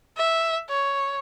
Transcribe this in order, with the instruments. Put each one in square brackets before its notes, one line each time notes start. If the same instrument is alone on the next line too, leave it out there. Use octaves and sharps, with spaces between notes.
[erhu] E5
C#5